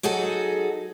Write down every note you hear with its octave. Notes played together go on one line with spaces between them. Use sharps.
F#3 D#4 F#4 G#4 A4